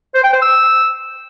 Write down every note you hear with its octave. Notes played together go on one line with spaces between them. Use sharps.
C5
G5
C5
E6